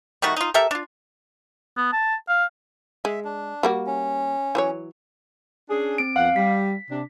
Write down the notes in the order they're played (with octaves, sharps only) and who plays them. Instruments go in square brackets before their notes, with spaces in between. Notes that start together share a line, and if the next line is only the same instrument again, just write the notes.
[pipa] D#3 G3 A3 F#4
D#4 F4
G4 A4 A#4 E5
D4 F4
[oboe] B3
A5
F5
[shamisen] G#3 [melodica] E5
[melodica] D4
[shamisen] G3 A#3 F#4
[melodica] C#4
[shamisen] E3 F#3 C#5
[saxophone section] C#4 D4 G#4
[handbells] C4 D7
[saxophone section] F2 B3 F#5 [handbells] F5
[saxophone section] G3 [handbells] B6
[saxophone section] C3 D4